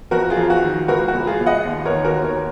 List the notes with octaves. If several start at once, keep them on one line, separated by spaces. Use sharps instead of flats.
F2 F#4 A#4
F4 G#4
F2
F#4
D#3
C#2 F#4 A#4
F#4
C#2
F4 G#4
C#2
D#5 F#5
D#2
A#4 C#5
D#3
F#4 A#4
D#2
A#4 C#5